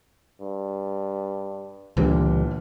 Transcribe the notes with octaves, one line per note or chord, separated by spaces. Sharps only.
G2
G1 C#2 A#2 D3 E3 G3